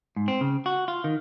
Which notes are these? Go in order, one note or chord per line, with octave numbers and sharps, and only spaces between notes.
G#2
C4
C#3
F#4
F4
D#3